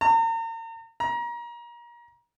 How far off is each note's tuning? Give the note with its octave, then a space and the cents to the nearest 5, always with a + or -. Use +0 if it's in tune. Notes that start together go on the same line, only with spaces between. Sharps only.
A#5 -40
A#5 +30